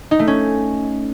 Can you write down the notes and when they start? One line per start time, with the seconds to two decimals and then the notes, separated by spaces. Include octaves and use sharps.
0.11 D#4
0.19 A3
0.27 C#4